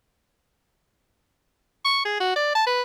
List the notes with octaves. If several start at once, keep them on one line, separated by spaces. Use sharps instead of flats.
C#6
G#4
F#4
D5
A5
B4